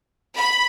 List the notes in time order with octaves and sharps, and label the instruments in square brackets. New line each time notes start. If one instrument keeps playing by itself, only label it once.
[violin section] B5